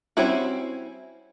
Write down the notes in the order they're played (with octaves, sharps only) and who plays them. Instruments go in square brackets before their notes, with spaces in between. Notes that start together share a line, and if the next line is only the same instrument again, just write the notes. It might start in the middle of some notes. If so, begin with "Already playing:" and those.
[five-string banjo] G3 C4 C#4 E4 F#4